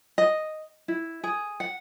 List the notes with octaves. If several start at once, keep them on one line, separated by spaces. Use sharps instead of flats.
D#5
E4
G#4
F#5